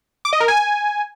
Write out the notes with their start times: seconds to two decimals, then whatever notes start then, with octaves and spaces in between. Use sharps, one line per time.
0.25 D6
0.33 D#5
0.40 A#4
0.48 G#5